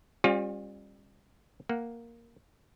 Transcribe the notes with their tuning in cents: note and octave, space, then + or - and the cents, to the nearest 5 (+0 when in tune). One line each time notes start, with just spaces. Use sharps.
G3 +35 C#4 -35 F4 +30
A#3 +0 F#5 +0